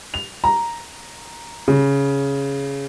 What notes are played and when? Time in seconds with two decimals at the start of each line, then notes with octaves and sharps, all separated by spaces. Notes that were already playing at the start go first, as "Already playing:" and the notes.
0.14 F7
0.44 A#5
1.68 C#3